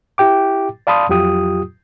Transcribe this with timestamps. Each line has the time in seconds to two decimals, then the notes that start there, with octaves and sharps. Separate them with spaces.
0.18 E4 G4 G5 D6
0.87 D5 F5 A5 B5 C6 D#6
1.09 F2 F#3 F4 G4 D#6